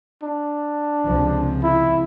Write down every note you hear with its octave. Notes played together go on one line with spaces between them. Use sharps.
D4
C#2 C3 F3
E4